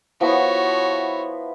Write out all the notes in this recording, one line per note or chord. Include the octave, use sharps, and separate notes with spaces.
F3 B3 E4 F#4 C#5